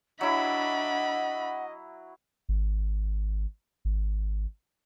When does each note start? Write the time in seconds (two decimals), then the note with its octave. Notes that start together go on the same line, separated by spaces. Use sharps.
0.21 F#3 D4 E4 D#5 F#5 B5
2.49 G#1
3.85 G#1